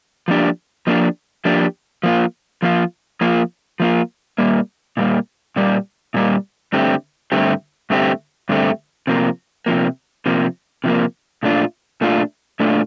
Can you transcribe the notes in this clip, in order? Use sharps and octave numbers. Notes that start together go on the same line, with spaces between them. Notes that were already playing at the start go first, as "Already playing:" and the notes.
F3 A#3 D4 G4
F3 A#3 D4 G4
F3 A#3 D4 G4
F3 A#3 F4
F3 A#3 F4
F3 A#3 F4
F3 A#3 F4
A#2 G3 A#3
A#2 G3 A#3
A#2 G3 A#3
A#2 G3 A#3
G2 D3 A3 C4 G4
G2 D3 A3 C4 G4
G2 D3 A3 C4 G4
G2 D3 A3 C4 G4
C3 F3 A#3
C3 F3 A#3
C3 F3 A#3
C3 F3 A#3
A#2 A3 D4 F4
A#2 A3 D4 F4
A#2 A3 D4 F4